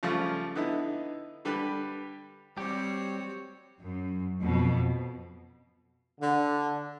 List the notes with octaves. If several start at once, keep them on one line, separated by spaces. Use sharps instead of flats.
C#3 F3 G3 A3 F4
D3 B3 D#4 E4
D3 G3 G4 B4
G3 C4 F#4 G4 C#5
F#2
F2 B2
D3